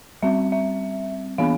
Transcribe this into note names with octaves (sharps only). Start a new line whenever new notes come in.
G3 C4 E5
E5
E3 B3 D4 F5